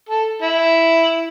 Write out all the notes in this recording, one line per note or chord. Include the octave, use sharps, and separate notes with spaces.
A4
E4